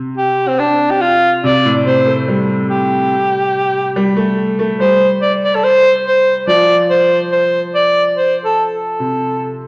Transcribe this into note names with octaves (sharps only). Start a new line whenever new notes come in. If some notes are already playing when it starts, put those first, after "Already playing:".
Already playing: C3
G4
C4
D4
G4
F4
C3 D5
A2
C3 C5
A3
G3
G4
G3
A3
A3
G3 C5
D5
D5
A4
C5
C5
F3 D5
C5
C5
D5
C5
A4
A4
C3